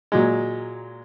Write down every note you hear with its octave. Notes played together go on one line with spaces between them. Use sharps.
A#2 F#3 G#3